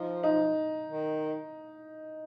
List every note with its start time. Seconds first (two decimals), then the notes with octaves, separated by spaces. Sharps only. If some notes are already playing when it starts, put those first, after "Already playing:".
Already playing: F3 D#4
0.23 D#4
0.88 D#3